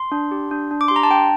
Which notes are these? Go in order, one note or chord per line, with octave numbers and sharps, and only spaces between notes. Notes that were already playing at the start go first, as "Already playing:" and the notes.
Already playing: C6
D4
G4
D4
D4
D6
C6
G4 A#5
A5
D4 G5